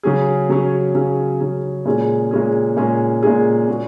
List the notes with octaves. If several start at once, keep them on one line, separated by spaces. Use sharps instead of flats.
C#3 F#3 C#4 G#4
C#3 F#3 C#4 G#4
C#3 F#3 C#4 G#4
C#3 F#3 C#4 G#4
A#2 G#3 C#4 G#4
A#2 G#3 C#4 G#4
A#2 G#3 C#4 G#4
A#2 G#3 C#4 G#4
A#2 G#3 C#4 F#4